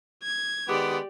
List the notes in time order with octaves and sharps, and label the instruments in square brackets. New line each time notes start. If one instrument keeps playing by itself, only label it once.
[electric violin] G#6
[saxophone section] D#3 G#3 B3 [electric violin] G4 D5